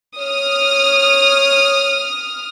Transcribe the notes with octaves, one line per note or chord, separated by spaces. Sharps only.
C#5 D#6 F6